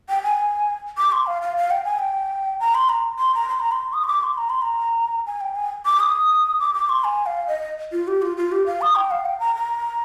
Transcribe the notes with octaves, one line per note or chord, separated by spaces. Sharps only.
G5
G#5
D6
C6
F5
F5
F5
G5
G#5
G5
A#5
C6
A#5
C6
A#5
C6
A#5
C6
D#6
C6
D6
C6
A#5
C6
A#5
G#5
G5
G#5
D6
D#6
D6
D6
C6
G#5
F5
D#5
F4
G4
F4
F4
G4
F5
D#6
G5
F5
G5
A#5
A#5